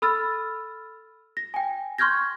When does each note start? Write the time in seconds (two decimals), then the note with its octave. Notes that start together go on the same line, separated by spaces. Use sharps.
0.02 A4 B5 E6 F6 A6
1.37 A#6
1.54 G5 G#5
1.98 C6 C#6 F6 G6 G#6 A#6